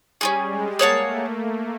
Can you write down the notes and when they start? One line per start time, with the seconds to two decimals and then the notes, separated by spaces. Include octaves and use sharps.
0.21 G3 C#4 F4 G#4
0.51 G#3
0.79 A#3 G#4 C#5 F#5 A5
1.08 A3